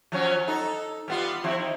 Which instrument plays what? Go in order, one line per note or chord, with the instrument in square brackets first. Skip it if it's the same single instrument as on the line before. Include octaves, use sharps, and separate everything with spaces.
[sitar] F3 F#3 C#4
D#4 A4
G3 B3 F4
F3 C4 E4
D#4